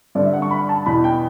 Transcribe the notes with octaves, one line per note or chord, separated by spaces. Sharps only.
G2 D3 D5
E5
F#5
C#6
B5
A5
E2 B2 B5
G5